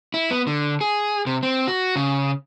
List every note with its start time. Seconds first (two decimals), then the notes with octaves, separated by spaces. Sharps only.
0.14 E4
0.31 B3
0.47 D3
0.81 G#4
1.26 C3
1.43 C4
1.68 F#4
1.96 C#3